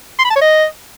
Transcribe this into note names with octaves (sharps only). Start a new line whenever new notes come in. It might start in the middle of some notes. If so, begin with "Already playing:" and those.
C6
B5
A5
C#5
D#5